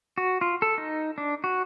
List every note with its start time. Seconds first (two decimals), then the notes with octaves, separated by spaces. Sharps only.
0.18 F#4
0.41 F4
0.62 A4
0.78 D#4
1.18 D4
1.44 F#4